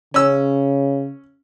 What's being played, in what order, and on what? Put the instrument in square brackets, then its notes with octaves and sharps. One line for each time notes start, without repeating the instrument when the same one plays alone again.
[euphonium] C#3 [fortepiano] C#4 E6